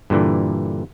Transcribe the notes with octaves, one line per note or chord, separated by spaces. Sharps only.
G2 A#2 D3 E3